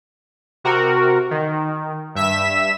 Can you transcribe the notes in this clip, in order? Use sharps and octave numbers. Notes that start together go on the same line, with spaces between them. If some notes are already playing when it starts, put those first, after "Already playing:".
C3 F#4 A#4
D#3
G2 E5 B6 E7